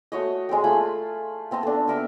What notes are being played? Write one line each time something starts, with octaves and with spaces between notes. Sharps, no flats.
A3 F#4 C#5 D#5
G#3 C4 D5 G5
A3 F4 G#5 B5
B3 C4 D#5 A5
D4 A4
B3 A#4 E5